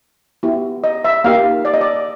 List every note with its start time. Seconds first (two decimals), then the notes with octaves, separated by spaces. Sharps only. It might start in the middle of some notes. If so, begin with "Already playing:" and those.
0.43 B3 E4 G4
0.84 D#5
1.04 E5
1.24 A#3 D#4 G4 F5
1.65 D5
1.74 D#5
1.81 D5